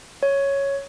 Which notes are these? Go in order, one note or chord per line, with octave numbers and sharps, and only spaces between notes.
C#5